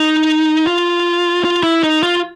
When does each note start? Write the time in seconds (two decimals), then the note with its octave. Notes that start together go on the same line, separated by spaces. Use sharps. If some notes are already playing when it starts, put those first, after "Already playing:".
Already playing: D#4
0.67 F4
1.45 F4
1.63 E4
1.84 D#4
2.03 F4